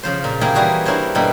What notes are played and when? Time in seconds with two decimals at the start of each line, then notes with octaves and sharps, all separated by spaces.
0.03 C#3 F3 C5
0.24 A#2
0.41 A#3 E4 F4 G4 G#4
0.54 E3 G3 F#4 G#4 C5
0.85 D4 E4 A#4 C5 C#5
1.15 G2 B2 G3 A#3 A4 B5